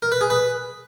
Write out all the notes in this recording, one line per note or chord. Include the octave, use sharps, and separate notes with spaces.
A#4
B4
G#4
B4